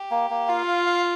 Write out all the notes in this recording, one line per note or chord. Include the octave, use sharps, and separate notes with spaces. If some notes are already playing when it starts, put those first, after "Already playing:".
Already playing: G4
A#3
A#3
F4 F5
F5
F5